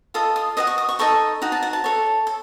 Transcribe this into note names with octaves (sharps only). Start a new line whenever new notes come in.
F4 A4 D#5 D#6
D#6
F#4 C5 D#5 D#6
C#6
D#6
C#6
D#4 A4 D#5 C#6
D#4 F#4
A5
F#5
A5
A4 C#5
A4